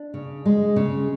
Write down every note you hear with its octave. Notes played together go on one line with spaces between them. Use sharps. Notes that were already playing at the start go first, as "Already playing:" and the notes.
Already playing: D4
C#3
G#3
C#3